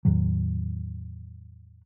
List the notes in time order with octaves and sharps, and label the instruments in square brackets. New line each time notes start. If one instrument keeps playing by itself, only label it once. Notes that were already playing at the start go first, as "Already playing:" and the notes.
[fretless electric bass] E2 A2 D#3 F#3